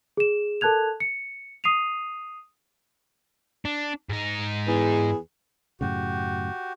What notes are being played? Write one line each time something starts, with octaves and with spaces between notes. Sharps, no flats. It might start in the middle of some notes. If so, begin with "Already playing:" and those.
G#4 E7
A4 A#4 A5 F#6 G#6 F7
C#7
D#6 C7 D#7 F7
D4
G#2 D#4
E2 G#4 B4
F#2 A2 C#3 F#4 G4